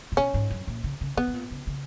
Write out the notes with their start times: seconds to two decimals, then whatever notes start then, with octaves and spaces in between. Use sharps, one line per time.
0.12 A#2
0.17 B2 C#4
0.34 G#2
0.50 F#2
0.67 A#2
0.84 C#3
1.01 C#3
1.17 B2 B3
1.28 B2
1.33 A#2
1.51 C#3
1.67 C#3